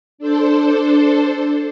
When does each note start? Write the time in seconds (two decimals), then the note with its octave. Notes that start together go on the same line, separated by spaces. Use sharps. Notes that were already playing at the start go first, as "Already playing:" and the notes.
0.18 D4 A4 C5